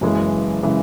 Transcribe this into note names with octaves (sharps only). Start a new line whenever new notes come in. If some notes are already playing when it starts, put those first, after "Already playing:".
F#1 F#2 C#3 E3 G#3
C#3 E3 G#3